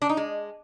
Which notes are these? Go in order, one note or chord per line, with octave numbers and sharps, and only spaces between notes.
D4
D#4
G#3